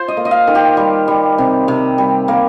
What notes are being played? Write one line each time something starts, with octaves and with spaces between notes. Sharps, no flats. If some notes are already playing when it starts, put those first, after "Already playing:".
Already playing: F4 C5
D#5
A#3
D#5
F5
D#3
G4
G3
G3
C3
C3
G3
A#3